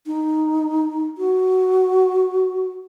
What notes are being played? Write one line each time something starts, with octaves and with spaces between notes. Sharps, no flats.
D#4
F#4